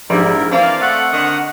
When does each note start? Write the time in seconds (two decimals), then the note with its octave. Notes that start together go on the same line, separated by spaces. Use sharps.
0.10 A#1 G#2 G3 E4 A#4
0.51 E3 A#3 C4 D5 F5 A5
0.80 A3 F#5
1.13 D3 D#3 C#6 D#6